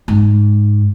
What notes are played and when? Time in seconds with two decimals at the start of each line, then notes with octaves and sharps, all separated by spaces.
0.08 G#2